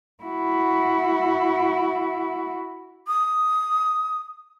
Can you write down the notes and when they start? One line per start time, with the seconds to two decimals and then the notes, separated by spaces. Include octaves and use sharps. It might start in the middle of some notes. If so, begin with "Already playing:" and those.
0.23 E4 F#4
3.08 D#6